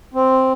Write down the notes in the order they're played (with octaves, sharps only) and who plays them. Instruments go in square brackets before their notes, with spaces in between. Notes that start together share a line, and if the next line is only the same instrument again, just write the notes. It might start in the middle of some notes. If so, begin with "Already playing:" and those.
[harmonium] C4